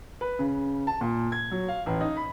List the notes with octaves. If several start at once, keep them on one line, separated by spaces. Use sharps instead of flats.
B4
C#3
A5
A#2
G#6
F#3
F5
A1
D#4
B5